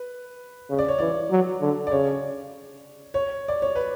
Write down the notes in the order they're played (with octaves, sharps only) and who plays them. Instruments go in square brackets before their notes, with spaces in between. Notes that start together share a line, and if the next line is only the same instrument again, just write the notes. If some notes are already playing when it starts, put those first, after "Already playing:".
Already playing: [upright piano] B4
[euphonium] C#3
[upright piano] D5
C#5
[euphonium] E3 [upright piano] D5
[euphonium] F#3
D3
[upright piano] D5
[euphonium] C#3 [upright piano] C#5
[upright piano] C#5
D5
C#5
B4